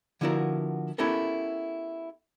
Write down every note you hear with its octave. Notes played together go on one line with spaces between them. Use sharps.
D3 F3 B3 E4 F#4 A#4
B3 C#4 E4 G4 A4 A#4